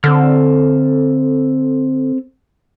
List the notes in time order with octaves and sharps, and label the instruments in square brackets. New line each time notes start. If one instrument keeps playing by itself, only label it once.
[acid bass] D3 [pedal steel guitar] C4 A4 F6